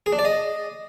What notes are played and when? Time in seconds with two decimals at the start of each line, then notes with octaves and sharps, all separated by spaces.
0.06 G#4
0.13 D4
0.19 D5
0.25 D#5